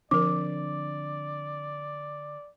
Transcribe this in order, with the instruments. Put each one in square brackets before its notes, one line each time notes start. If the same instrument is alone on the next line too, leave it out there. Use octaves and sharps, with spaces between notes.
[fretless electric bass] D3 C4 D4 [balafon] F3 A#4 [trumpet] D5 [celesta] D6